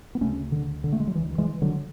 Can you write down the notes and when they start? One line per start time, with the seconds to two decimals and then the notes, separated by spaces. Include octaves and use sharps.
0.15 B3
0.21 D2 C#3 A3 C#4
0.52 D3
0.84 D3
0.93 A3
1.00 G#3
1.07 F#3
1.15 C#3 E3
1.18 D2
1.38 E3 G#3
1.62 D3 F#3